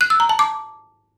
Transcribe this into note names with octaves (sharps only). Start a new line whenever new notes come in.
F#6
E6
A#5
A5
D6